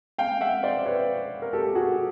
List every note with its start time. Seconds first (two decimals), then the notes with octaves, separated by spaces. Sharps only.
0.18 F5 G5
0.41 E5 F#5
0.63 C5 D5
0.86 B4 C#5
1.42 A#4
1.53 G4 A4
1.75 F#4 G#4